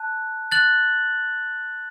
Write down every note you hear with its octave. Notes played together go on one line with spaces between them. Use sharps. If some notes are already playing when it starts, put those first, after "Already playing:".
Already playing: A5 F#6
F#6 A6 F#7